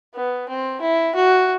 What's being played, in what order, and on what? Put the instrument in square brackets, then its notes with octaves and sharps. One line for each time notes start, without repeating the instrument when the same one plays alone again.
[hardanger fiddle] B3
C4
E4
F#4